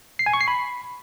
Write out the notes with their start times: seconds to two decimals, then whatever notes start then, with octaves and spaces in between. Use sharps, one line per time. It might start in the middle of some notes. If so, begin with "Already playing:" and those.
0.19 C7
0.26 G#5
0.34 C#6
0.41 C7
0.48 B5